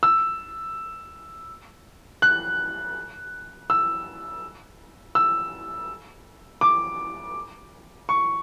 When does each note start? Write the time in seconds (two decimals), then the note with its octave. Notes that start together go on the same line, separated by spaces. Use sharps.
0.03 E6
2.22 F#6
3.70 E6
5.15 E6
6.61 D6
8.09 C#6